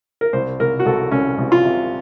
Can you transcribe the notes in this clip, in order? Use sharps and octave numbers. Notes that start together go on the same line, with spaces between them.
A#4
C2 C5
C2 A#4
F#4
C2 A4
C2 C#4
C2
F4
C3